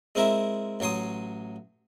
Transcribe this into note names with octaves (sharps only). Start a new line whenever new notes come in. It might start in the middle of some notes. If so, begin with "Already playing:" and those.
G#3 C4 E4 A#4 E5
A1 F#3 C#5 C6 D#6